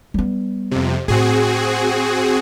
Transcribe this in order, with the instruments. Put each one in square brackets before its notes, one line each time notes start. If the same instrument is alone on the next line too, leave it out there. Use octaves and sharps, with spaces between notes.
[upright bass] G3 B3
[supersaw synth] F2 C3
[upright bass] A2 [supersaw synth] C4 F#4 G#4